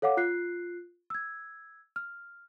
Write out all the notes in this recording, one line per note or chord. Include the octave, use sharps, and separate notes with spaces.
A4 C#5 F5 F#5 D6
F4 F#6 C7
E6 G#6
F6